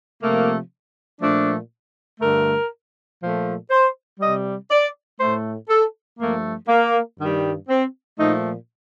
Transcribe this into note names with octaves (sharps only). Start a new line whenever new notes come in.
C3 F3 A3 A#3
A#2 F3 A3 D4
G2 D3 A3 A#4
A#2 F3 A3
C5
C3 G3 D#5
D5
A2 A3 C5
A4
G2 F3 A3 A#3
A#3
G2 D#3 G3
C4
A#2 F3 A3 D#4